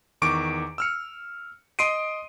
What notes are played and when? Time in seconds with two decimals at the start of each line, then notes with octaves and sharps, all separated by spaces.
0.22 E2 D#3 C#6 D6 D7
0.78 E6 F6 C#7
1.79 D#5 C6 D#6 C7 D7 D#7